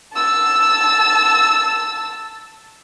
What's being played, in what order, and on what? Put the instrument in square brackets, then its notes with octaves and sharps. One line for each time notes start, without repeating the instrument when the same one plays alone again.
[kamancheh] A5 E6